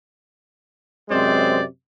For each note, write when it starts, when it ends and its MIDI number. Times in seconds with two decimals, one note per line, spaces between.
1.10 1.63 42
1.10 1.63 48
1.10 1.63 56
1.10 1.63 60
1.10 1.63 72
1.10 1.63 74